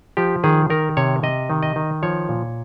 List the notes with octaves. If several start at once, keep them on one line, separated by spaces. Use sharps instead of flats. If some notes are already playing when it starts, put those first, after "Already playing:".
F3 G4
D#3 G#4
D#3 A#4
C3 C#5
C3 D#5
D#3
D#5
D#3
F3 C#5
A#2